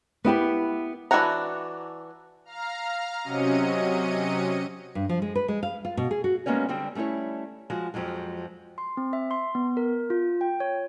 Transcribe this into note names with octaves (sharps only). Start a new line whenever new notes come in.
B3 E4 G4 B4
E3 D4 F#4 F#5 A#5
F5 A#5 F6
C3 F#3 C#4 D#5 C#7 D#7
G2
F3
G#3
B4
G#3
F5
F4
B2
G#4
F#4
G3 G#3 A#3 B3 C#4 C#5
D3 G3 C4
G3 A3 C#4 E4 C#5
F3 G#3 F#4
F2 F3 F#3 G#3
C6
C4
E5
C6
B3
A#4
F4
G5
C#5